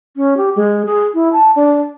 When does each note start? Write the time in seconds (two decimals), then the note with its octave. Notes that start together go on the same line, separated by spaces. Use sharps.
0.16 C#4
0.37 G4
0.56 G#3
0.86 G#4
1.14 E4
1.33 A5
1.56 D4